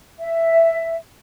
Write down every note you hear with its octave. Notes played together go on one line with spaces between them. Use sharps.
E5